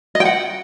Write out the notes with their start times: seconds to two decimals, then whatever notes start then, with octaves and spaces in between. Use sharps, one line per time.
0.15 D#5
0.20 G5
0.25 F#5